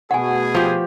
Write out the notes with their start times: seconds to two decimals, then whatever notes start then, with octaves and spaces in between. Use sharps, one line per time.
0.11 B2 A3 B3 F#4 G#4 F#5 G#5
0.55 F3 G4